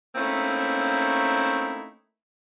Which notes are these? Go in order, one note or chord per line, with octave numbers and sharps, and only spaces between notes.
A3 A#3 C4 C#4 D#4 E4